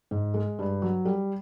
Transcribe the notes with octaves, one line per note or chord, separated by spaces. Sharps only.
G#2
G#3
G2
F#3
G3